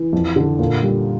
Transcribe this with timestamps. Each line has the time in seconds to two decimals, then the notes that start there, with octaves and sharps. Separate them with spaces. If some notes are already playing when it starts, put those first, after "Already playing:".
Already playing: E3
0.13 F2
0.36 D3
0.59 A#2
0.83 G3